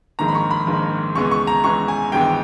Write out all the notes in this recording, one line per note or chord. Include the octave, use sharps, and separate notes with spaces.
A#1 G#2 D#3 A#3 A#5
B5
C#6
B5
A#1 G#2 D#3 A#3
C#2 C#3 E3 G#3 B3 C#6
C#6
A#5
C#2 C#3 E3 G#3 B3 C#6
G#5
G#1 G2 E3 G#3 B3 G5